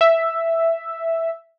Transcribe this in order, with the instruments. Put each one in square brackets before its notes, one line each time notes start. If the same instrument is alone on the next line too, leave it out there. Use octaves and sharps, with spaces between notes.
[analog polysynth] E5